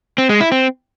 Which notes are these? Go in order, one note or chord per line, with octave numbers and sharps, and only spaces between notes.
C4
G#3
E4
C4